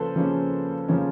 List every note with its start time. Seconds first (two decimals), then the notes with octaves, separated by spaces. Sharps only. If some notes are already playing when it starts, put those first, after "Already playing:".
Already playing: C#3 F3 A#3 C#4 A4 B4 C5
0.15 C#3 F3 A#3 C#4
0.89 C#3 F3 A#3 C#4